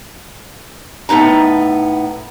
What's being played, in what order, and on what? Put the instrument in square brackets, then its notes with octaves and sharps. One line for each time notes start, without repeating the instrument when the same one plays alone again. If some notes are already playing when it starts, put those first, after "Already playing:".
[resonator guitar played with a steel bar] A2 B3 D#4 A#5